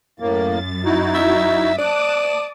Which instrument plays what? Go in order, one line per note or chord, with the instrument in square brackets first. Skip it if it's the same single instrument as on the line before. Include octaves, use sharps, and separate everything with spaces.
[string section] F#2 A6 [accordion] A2 A#3
[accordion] D#4 E4 F#4
[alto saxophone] E5
[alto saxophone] D5 [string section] A5 D6 D#6 [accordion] F#6